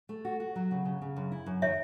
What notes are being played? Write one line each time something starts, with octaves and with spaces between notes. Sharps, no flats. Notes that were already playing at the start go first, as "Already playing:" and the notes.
A3
F#4
F#4
F#3
C#3
C#3
C#3
F#2
E4
F#2
D#3 C#5 E5